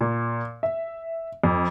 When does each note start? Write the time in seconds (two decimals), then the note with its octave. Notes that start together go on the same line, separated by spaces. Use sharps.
0.01 A#2
0.63 E5
1.44 F2